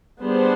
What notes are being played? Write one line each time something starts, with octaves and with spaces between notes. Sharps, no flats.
G3 B3 D4 G#4 C5